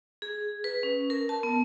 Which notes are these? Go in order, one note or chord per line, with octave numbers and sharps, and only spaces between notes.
G#4
B4
C#4
A#4
A5
B3